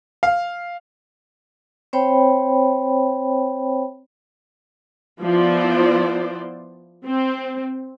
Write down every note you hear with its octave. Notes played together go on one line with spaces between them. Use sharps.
F5
C4 C5 C#5 G5 B5
F3 B3 E4 F4 C5 D5
C4